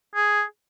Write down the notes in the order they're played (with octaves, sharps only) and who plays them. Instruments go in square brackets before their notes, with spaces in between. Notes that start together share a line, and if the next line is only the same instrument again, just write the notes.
[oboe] G#4